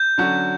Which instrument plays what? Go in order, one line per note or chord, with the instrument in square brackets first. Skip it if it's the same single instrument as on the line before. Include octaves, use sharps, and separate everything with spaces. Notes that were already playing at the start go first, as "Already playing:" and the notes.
Already playing: [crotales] G6
[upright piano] D3 F#3 C#4 F#4